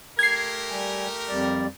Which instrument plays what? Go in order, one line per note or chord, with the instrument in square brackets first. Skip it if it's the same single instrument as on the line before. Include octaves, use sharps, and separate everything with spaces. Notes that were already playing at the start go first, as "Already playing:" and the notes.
[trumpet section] A3 G4 A#4 [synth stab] G#6 C7
[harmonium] G3 G#5
F2 G3 D5